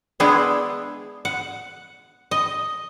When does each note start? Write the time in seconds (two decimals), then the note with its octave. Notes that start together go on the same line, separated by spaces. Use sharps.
0.20 G#3 B3 D4 E4 G#4
1.25 F#5
2.31 D#5